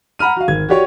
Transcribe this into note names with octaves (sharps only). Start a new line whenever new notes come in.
F#5 A#5 B5 F6 D#7
F#4 F5
G#1 G#6
F#4 G4 C#5 D5